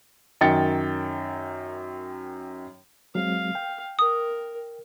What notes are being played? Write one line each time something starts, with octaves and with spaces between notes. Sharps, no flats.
F#2 D#3 G5 A6 C#7
F#3 G#3 C4 F5
G5
A#4 D#6